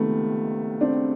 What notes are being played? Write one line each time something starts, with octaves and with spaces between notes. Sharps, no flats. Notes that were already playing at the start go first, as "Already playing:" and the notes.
Already playing: C#2 C3 D#3 G3 A3 B3
C4 D4